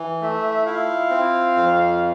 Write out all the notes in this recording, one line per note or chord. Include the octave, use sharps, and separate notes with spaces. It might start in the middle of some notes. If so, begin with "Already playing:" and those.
Already playing: E3
A3 E4 E5
E4 F4 F5
C4
F2